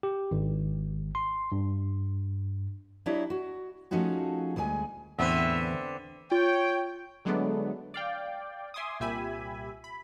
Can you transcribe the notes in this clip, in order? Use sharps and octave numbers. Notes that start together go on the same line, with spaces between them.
G4
G#1
C6
G2
F#3 D4 E4 G4 C#5 D#5
F#4
F3 A3 C#4 D#4 F#4 G#4
D2 G3 G#3 G#4 G#5
E2 A2 D3 B3 C4 B4 E5
F4 C#5 G5
D3 F#3 G#3 A3 B3 D4
D5 F5 G5
E5 G#5 C6 D6 D#6
C2 A#2 G4 E5 G#5 B5
B5